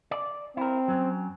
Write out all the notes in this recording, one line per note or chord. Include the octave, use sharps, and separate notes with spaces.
D5
C4 E4 A#4
F#2 F#3